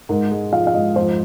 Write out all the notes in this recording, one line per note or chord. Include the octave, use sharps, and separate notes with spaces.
G#2 A#4
G#3
F3 F5
F5
G#2 D#5
F2 C5